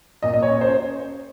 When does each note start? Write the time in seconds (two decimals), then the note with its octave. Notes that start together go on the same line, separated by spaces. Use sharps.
0.23 A#2 D#5
0.34 D#5
0.43 C#5
0.48 C#4
0.61 C5